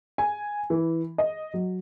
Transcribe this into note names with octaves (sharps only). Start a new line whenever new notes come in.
G#5
E3
D#5
F#3